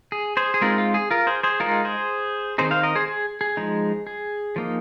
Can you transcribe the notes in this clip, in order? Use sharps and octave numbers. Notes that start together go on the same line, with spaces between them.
G#4
G#4 C5
G#4
G#3 C4 D#4 F4 A#4
F4
G#4
F4 A#4
G#4 C5
G#4 C5
G#3 D#4 F4 A#4
G#4 C5
D#3 C4 D#4 G#4 C5
C5 F5
A#4 D#5
G#4 C5
G#4
G#4
F3 G#3 D#4
G#4
F3 A#3 D#4